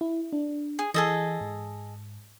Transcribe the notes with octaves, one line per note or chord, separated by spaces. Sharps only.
E4
D4
G#4
E3 G#4 A4 D#5
G#2